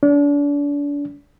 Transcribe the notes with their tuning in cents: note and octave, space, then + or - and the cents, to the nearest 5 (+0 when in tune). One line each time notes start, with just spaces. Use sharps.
D4 -35